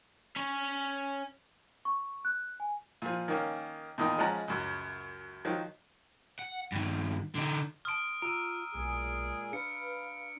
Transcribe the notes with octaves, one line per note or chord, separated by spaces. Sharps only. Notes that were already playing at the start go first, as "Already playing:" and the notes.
C#4 C#5
C#6
F#6
G#5
A#2 F3
D#3 A#3 C#4
E2 A#2 D#3 D#5
F3 G#3 C#4 F#5 A5 A#5
C#2 F#2
D#3 F3 F#3
F#5
G2 D#3
D3 D#4
A5 C6 D#6 F6 D7
F4 A#5 E6 D7 D#7
B1 A#2 G#3 G#4
D4 B4 F5 C#7